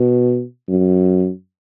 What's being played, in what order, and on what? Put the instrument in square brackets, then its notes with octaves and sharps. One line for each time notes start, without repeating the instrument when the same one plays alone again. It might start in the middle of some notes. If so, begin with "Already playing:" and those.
Already playing: [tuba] B2
F#2